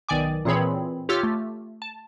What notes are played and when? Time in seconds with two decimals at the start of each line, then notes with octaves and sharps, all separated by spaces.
0.09 B1 D#3 D5 G#5 D6
0.45 A#2 E3 C4 G#4 C#5 B5
1.09 F4 G4 C#5 D6 E6 F6
1.23 A3
1.82 A5